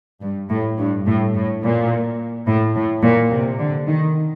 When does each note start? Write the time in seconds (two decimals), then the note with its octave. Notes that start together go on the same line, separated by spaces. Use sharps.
0.22 G2
0.50 A2
0.79 G2
1.07 A2
1.35 A2
1.63 A#2
2.47 A2
2.75 A2
3.03 A#2
3.31 C3
3.60 D3
3.87 D#3